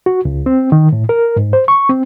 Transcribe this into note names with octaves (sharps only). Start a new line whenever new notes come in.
F#4
C#2
C4
D#3
A2
A#4
G#2
C5
C#6
C4